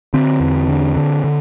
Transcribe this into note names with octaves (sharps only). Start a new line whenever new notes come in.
D3 C4
E2
D3
D3
D3